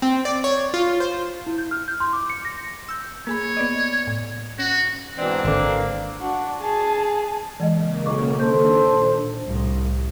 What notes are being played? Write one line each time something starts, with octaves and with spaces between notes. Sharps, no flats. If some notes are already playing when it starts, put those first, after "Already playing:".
C4
D5
C#5
F4
C5
E4
G6
F6
G6
C6
D6
C#7
A#6
E6 G6
A#3 G#4 C#5 B5
B3 D5 D#5
A2
C#4 F#4
G#2 B2 E3 C4 D4
G#1 D3 A#3
D4 F#4
G#4 A5
C#3 E3 G#3 A#3 D#5
B1 D#5 C#6 D6
D#3 D4 A4 C5 G6
A#2
C2 A2